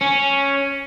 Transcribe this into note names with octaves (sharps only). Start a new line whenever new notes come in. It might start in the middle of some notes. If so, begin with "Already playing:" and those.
C#4